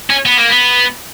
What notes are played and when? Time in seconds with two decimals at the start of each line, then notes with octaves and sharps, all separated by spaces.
0.10 C#4
0.26 B3
0.38 A#3
0.49 B3